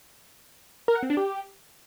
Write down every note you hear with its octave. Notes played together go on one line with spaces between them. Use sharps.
A#4
F#5
C4
D4
G4